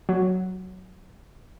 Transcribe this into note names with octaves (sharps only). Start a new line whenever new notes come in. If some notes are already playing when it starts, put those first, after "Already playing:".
F#3